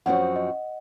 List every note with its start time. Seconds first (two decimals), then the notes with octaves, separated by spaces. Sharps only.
0.06 F#2 F3 C4 F#4 F#5
0.36 D#5